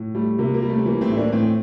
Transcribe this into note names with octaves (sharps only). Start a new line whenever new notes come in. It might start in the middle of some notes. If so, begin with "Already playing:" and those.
Already playing: A2
G3 A3
C3 A#3
A#3
G3
A3
C4
E3 A#3
A3 C4
A2 E4
A#3 D4
A2 A3 C4